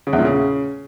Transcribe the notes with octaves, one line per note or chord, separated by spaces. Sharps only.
C#3
E2
A#2
C#3